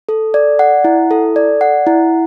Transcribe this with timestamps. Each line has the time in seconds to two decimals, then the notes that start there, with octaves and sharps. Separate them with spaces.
0.09 A4
0.34 D5
0.59 F#5
0.84 E4
1.11 A4
1.36 D5
1.61 F#5
1.87 E4